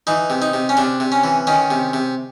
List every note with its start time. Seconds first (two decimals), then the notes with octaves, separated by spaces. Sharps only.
0.07 E3 D#4
0.30 C3
0.42 D#4
0.54 C3
0.69 C#4
0.77 C3 D4
1.00 C3
1.12 C#4
1.24 E3
1.47 D#3 C#4
1.70 C3
1.93 C3